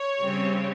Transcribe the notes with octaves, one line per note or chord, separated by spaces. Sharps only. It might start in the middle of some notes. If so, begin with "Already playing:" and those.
Already playing: C#5
C#3 G3 C4